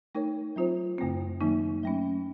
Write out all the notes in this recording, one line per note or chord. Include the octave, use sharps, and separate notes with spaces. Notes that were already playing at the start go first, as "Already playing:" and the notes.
A3 D#4 A#4 C#5
F#3 C4 F4 C5
F#2 C#3 A3 C4
D#3 F#3 A#3 D#4
F#3 A3 C#4